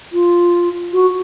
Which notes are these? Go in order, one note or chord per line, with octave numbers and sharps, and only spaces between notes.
F4
F#4